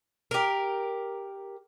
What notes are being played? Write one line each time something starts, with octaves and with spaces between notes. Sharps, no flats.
G4 A#4